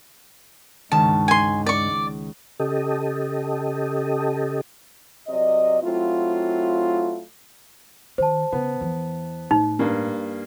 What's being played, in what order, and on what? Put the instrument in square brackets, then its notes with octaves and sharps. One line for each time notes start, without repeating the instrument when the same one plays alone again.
[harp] C#2 D#3 [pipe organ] G2 G#3 [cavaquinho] A5
[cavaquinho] G#5 C6
D5 C#6
[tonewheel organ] C#3 G4 A4 D#5
[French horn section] C3 F#3 D5 D#5
F#3 A3 C4 E4 F4
[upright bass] D#3 [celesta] C5 A5
[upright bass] C#3 [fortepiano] B3
[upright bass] E2 E3
[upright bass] A2 [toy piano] D#4
[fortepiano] G2 A#3